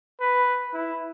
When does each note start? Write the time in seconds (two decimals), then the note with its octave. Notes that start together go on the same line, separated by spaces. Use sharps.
0.20 B4
0.74 E4